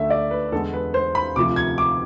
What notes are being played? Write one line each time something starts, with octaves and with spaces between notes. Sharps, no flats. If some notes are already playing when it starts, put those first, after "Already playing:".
Already playing: D2 D3 A3 E5
D5
B4
E2 D3 G#3 B3 A4
B4
C5
B5
D2 C3 F3 D6
G#6
D6